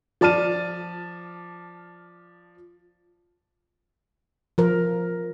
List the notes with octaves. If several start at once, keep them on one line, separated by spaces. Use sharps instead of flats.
F3 D5 A5 F6 D#7
F3 A#4